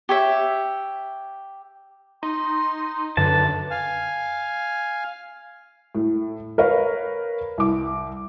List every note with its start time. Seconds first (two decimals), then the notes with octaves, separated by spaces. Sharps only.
0.09 G4 C#5 E5
2.23 D#4 C6
3.17 F#2 D3 B4 A5
3.71 F5 G#5 F6
5.95 A2
6.58 A#4 B4 C#5 F5
7.58 C2 D6